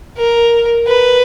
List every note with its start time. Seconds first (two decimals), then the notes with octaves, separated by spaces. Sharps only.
0.17 A#4
0.88 B4